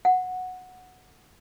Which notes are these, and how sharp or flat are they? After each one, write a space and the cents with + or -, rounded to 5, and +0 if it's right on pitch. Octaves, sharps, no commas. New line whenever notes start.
F#5 -10